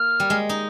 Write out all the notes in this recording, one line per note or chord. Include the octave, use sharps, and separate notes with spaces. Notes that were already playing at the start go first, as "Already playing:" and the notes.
Already playing: A#3 F6
G3
G#3
D#4